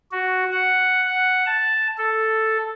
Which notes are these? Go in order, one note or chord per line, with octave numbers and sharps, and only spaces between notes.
F#4
F#5
F#5
A5
A4